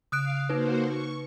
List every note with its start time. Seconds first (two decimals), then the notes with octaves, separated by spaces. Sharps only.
0.12 C#3 F5 D#6 F#6 D7
0.49 A#3 D#4 F#4 B4 C5
0.81 C#6